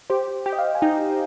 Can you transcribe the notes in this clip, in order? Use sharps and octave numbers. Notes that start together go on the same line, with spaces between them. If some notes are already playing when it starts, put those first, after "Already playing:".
G4 C5
G4
D#5
F5
G#5
D#4 G5